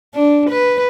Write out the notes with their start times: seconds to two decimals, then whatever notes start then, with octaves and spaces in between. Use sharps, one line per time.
0.15 D4
0.49 B4